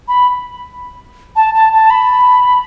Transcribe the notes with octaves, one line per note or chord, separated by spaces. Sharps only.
B5
A5
A5
A5
B5